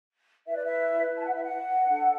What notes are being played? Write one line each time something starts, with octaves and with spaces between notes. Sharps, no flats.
E4 B4 E5
D5
E5
A5
F#5
E5
F#5
D4 A4